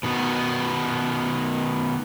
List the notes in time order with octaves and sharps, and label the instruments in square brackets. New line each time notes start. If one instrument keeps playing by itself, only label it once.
[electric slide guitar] B2 D#3 B3